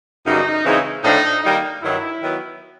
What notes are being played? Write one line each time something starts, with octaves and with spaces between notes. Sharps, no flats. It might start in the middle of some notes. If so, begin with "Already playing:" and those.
F#2 C#3 E3 G3 D#4
C#3 E3 G#3 C4 D#4
A2 F3 A3 D4 D#4
D#3 G3 A#3 D#4
G2 D#3 F#3 E4
D#3 F#3 B3